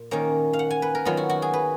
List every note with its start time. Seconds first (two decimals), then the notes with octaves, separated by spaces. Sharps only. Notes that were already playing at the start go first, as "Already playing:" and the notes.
Already playing: A#2
0.11 D#3 A#3 C#4
0.53 F5
0.59 F#5
0.70 G#5
0.82 B4
0.95 A#4
1.05 D#3 F#3 B3 F4
1.17 F#4
1.29 F#4
1.42 G#4
1.53 B4